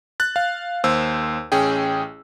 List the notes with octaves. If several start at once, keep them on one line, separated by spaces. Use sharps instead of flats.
F#6 A6
F5
D#2 C5 E6
A1 C#4 G#4 G5